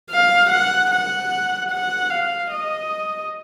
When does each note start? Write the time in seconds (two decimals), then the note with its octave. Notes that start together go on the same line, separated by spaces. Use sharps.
0.10 F5
0.50 F#5
0.90 F#5
1.70 F#5
2.10 F5
2.51 D#5